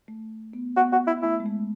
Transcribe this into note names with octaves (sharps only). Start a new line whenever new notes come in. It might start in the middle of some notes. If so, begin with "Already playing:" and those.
A3
B3
B3 F#4
F#4
E4
A3 E4
G#3
A3